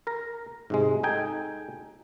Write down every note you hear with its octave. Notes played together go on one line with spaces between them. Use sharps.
A#4 A#5
G#2 C3 G#3
D#4 A4 G5 G#5